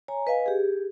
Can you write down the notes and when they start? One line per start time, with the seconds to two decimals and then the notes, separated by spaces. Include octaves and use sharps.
0.08 C#5 G#5 A#5
0.27 B4 D#5 F5 G#5
0.46 G4 G#4